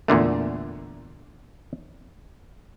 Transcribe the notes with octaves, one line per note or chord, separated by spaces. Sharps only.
E2 A#2 D3 A3